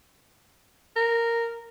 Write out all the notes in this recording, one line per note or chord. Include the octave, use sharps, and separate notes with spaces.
A#4